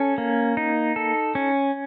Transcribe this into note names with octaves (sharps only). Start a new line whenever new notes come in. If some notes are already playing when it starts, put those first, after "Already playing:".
Already playing: C#4 A4
A#3
D#4
A4
C#4